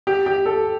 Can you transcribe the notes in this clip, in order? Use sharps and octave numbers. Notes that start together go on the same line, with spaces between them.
G4
G4
A4